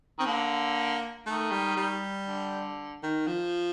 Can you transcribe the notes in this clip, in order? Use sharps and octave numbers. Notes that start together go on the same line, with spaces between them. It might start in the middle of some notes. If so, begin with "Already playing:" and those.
D#3 C4
D3 A#3
D#3 A3
G3
G3
D3
D#3
F3